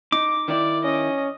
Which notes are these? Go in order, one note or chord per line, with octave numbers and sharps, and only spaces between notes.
D#4 D6
D#3 E4 D5
C#4 D#5